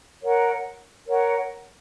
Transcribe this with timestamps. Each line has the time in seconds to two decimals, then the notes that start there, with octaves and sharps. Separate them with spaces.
0.22 A#4 C#5 F#5
1.07 A#4 C#5 F#5